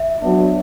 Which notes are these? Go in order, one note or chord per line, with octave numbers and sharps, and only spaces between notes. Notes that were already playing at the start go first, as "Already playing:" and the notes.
Already playing: E5
F#3 B3 D4